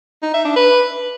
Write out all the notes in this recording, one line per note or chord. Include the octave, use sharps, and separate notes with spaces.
D#4
E5
D4
B4